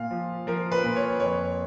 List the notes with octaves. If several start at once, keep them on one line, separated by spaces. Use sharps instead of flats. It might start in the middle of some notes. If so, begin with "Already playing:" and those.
Already playing: A#2 F5
F3
F3 A#4
B4
A#2
C#5
F2 C#5